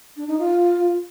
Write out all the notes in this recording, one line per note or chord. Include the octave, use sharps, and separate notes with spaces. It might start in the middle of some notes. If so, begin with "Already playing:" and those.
D4
D#4
F4